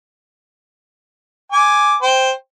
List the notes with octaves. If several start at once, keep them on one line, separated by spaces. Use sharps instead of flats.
G#5 D6
C5 G5